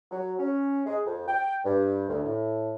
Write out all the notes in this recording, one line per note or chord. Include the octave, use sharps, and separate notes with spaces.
F#3
C#4
G#3
F2
G5
G2
D2
A2